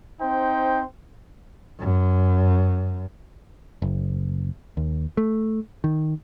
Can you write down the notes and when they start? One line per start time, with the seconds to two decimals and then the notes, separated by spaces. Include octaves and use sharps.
0.21 C4 D#4 C5 G5
1.80 F#2
3.82 F#1
4.77 D#2
5.17 A3
5.84 D#3